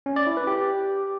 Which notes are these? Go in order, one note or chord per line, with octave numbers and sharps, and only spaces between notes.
C#4
D5
E4
B4
G4